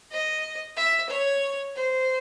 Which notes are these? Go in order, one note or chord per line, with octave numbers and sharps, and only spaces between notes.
D#5
E5
C#5
C5